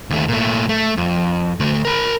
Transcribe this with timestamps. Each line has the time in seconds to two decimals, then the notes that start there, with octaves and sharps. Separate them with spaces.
0.10 D#2 A3
0.28 A#2 A3
0.69 A3
0.97 F2
1.60 D2 A3
1.85 A#4 B5